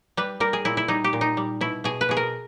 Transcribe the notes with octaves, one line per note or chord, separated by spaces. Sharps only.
G3 B4
G3 A#4
G#4
A#2 E4
E4
G3 D#4
G4
A#2
D#4
G3
B2 E4
B2 G#4
B4
B2 G#4
A#4